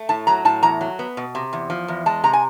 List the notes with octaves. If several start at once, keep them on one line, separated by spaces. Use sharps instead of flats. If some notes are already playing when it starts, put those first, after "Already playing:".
Already playing: A3
A2 A5
F#3 A#5
A2 A5
E2 A#5
F#3
B3
B2
C3
E2
F3
E2
G#3 A5
C3 A#5
G#5